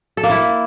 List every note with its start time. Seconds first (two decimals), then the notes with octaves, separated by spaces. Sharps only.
0.17 A4
0.24 A#3
0.30 E4